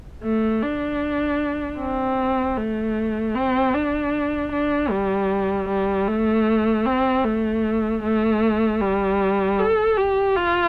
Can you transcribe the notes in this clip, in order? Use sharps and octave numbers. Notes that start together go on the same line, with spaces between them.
A3
D4
C4
A3
C4
D4
D4
G3
G3
A3
C4
A3
A3
G3
A4
G4
F4